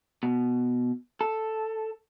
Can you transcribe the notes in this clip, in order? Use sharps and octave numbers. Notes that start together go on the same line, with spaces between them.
B2
A4